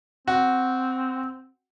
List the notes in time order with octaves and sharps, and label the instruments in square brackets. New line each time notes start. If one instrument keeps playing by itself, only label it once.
[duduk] C4 [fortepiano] F#4